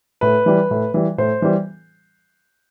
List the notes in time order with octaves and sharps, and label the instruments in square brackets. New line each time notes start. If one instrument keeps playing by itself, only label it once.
[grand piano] A2 B4
E3 G3
A2
E3 G3
A2 C5
E3 G3